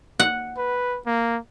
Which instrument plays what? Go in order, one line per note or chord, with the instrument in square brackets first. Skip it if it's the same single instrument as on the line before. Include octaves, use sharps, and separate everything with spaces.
[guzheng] F#5
[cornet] B4
A#3